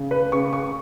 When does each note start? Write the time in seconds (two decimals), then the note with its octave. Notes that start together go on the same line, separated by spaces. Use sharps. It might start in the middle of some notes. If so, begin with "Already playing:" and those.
Already playing: C#3
0.11 B4
0.32 C#3 C#6
0.53 C#6